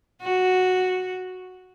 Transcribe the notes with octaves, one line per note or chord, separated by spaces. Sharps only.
F#4